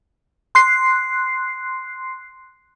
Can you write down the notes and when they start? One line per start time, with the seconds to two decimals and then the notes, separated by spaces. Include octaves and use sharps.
0.55 C6 F#6 C7